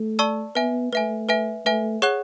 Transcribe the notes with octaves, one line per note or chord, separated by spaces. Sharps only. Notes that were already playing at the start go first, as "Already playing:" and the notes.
Already playing: A3
D5 A5 C#6 E6
B3 B4 E5 G#5
A3 B4 E5 G#5
B4 E5 G#5
A3 B4 E5 G#5
G#4 C#5 F#5 C#6 F#6